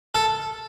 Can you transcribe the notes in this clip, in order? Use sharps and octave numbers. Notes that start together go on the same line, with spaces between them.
A4